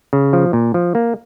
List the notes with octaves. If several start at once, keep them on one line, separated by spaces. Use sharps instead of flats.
C#3
F3
A#2
F3
A#3